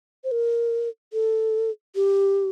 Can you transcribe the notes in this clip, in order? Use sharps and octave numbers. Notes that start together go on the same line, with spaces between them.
C5
A#4
A4
G4